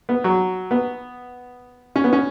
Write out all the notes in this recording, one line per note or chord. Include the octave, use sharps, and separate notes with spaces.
B3
F#3
B3
C#4
B3
C#4